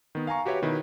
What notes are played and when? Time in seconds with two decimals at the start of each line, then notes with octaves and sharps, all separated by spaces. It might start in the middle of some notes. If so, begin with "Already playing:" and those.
0.15 D#3 B3
0.27 F5 G#5 A#5 C#6
0.46 F#4 G4 B4 C#5 E5 G5
0.62 B2 D#3 E4 B4